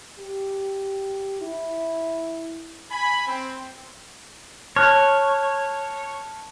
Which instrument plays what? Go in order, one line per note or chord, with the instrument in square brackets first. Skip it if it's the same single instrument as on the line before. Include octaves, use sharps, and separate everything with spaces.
[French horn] G4
E4
[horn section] G#5 B5
C4
[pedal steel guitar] C#5 [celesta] A5 F6 F#6